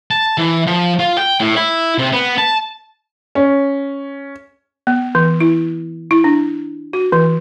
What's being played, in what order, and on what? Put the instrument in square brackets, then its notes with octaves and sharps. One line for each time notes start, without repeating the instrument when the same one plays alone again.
[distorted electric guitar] A5
E3
F3
F4
G5
A2
E4
C3
B3
A5
[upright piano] C#4
[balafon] B3
E3
E4
E4
D4
F#4
E3